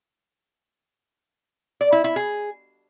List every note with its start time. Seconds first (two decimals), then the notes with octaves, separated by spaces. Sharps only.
1.81 D5
1.92 E4
2.04 E4
2.16 G#4